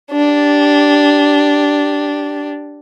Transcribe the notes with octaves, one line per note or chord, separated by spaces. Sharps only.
D4 G4